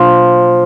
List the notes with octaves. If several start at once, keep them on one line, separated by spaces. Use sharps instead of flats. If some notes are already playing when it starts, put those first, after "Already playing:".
Already playing: B2 F3 F#3 A#3 D4